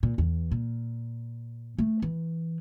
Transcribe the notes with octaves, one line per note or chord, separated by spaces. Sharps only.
A#2
E2
A#2
A3
E3